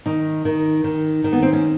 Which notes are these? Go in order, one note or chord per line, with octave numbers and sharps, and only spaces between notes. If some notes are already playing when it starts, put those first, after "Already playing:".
D#3 D#4
D#3
D#3
D#3
B3
C4
C#4